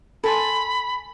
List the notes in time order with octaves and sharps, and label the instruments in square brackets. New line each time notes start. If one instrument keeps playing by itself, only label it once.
[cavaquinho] A4 G#5 C6 [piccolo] B5